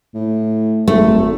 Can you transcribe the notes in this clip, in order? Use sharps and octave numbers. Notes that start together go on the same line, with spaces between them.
A2
G#1 A3